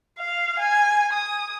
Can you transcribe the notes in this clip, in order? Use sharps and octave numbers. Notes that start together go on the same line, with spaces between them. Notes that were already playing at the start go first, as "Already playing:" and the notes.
F5
G#5
D#6